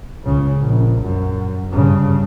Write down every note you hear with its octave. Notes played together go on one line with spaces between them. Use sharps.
C#2 C#3
A#1
F#2
G2 C#3